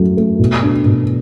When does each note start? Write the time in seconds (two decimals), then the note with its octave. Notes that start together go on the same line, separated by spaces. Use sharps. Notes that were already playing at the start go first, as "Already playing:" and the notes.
Already playing: F#2 F#3 A3
0.17 A3
0.39 B2
0.63 D4
0.85 B2